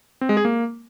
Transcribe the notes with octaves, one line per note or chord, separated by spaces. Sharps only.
C4
G#3
G#4
A#3